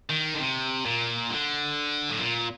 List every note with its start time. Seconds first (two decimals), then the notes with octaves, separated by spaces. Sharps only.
0.10 D#3
0.35 D3
0.40 C3
0.85 A#2
1.30 D3
2.11 A2
2.20 A#2